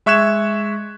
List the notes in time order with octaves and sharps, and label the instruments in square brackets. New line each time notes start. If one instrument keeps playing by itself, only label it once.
[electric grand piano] G#3 E5 C#6 F#6 G#6 E7